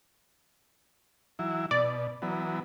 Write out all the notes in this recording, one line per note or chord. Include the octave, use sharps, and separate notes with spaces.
E3 F#3 E4
B2 D5
E3 F#3 B3